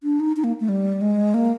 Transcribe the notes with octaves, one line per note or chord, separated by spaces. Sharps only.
D4
D#4
D#4
A#3
A3
G3
G#3
A#3